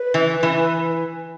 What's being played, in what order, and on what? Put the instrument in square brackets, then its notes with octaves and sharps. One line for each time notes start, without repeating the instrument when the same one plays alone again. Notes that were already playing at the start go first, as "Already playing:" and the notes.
Already playing: [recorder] B4
[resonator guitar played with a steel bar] E3
E3